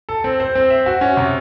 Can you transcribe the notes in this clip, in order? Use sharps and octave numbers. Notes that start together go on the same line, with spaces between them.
A4
C4
C5
C4
E5
F#4
C#4
C3